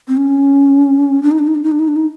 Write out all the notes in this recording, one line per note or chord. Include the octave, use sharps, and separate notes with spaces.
C4
C#4
D4
D#4
D4
D#4
D4
D#4
D4
D#4
D4
D#4